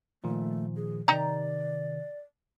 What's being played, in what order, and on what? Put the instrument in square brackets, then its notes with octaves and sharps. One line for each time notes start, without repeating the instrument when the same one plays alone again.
[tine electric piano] A#2 D#3 F3 [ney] A3
[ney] G#4
[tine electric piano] C3 D#3 [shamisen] D#4 G4 A#5 [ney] D5